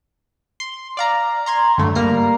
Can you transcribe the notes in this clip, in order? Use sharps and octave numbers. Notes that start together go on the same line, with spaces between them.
C6
D5 F5 A#5
A#5 C6 G#6
G2 D3 F#3 A3
G3 A#3 A#5 C7